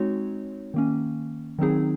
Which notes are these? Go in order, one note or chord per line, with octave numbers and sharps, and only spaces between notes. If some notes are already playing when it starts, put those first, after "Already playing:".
Already playing: G#3 C4 D#4 F#4 C#5
D#3 A#3 C#4
D#3 F#3 C4 D#4 G#4